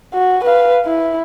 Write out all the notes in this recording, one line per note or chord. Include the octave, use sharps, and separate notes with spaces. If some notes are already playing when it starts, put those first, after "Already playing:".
F#4
B4 F5
E4